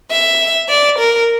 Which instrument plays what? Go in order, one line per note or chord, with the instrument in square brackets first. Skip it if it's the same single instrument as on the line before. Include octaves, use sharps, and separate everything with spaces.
[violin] E5
D5
A#4